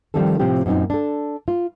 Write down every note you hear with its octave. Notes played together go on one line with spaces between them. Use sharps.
D#3 F3 G3 G#3 C4 A4
A2 C3 F3 C4 G4
F#2 A#2 C4 D4 D#4
D4 A4
F4